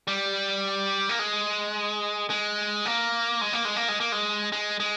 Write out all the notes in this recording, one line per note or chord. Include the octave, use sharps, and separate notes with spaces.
G3
A#3
G#3
G#3
A#3
G#3
A#3
G#3
A#3
G#3
A#3
G#3
G#3
G#3